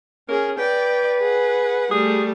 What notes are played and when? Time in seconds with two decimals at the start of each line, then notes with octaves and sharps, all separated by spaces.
0.28 C#4 G#4 A#4
0.59 B4 D5 G5
1.21 G#4 F#5
1.91 G3 A3 G#4